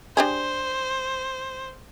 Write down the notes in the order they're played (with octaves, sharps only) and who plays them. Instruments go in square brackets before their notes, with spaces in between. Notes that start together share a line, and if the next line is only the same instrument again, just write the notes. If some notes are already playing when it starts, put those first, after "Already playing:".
[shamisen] D4 G4 G#4 [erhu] C5